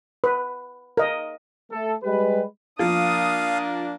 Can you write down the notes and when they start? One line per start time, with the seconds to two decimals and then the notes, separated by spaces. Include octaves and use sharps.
0.24 B4
0.97 A#4 D#5
1.71 A3 A4
2.03 G3 G#3 G4 B4
2.79 F3 A#3 D4 F5 D#6